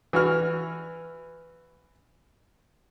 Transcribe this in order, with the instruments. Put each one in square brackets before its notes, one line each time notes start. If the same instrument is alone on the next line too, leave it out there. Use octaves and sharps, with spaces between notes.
[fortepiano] E3 F#4 F6